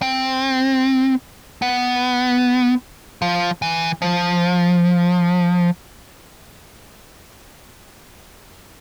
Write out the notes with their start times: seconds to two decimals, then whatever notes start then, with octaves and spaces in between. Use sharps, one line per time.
0.02 C4
1.62 B3
3.22 F3
3.62 E3
4.02 F3